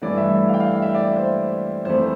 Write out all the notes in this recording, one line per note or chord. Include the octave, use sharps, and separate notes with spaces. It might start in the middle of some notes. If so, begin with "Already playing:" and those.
G2 E3 A3 D5
E5
F5
G5
F5
F5
E5
D5
C5
F2 E3 A3 C5